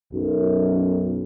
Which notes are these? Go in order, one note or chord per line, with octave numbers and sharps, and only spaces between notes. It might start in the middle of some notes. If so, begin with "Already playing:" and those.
B1 F#2